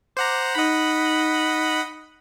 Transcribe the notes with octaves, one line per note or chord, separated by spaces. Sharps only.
C5 F#5 A#5 D6
D#4 D#5 F#5 B5